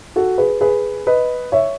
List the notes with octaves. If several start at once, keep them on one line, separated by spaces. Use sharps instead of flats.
F#4 A4
G#4 B4
G#4 B4
B4 D#5
C#5 E5